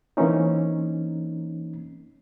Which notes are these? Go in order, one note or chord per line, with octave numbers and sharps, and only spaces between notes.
E3 A#3 C4 C#4 D#4